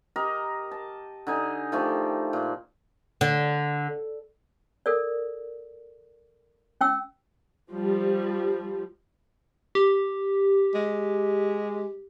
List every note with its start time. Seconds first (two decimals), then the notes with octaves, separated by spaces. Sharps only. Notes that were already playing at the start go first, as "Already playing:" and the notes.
0.16 G4 A#4 D#5
0.71 A5
1.27 D3 D#4 G#5
1.72 D#3 F3 A3 G4
2.33 A#2
3.21 D3
4.86 A4 A#4 D5
6.81 C#4 G5 E6
7.70 F3 G3
9.75 G4
10.74 G#3